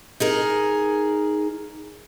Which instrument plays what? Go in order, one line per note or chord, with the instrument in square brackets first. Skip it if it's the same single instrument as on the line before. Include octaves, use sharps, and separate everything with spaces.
[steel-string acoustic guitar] D#4 G#4 A#4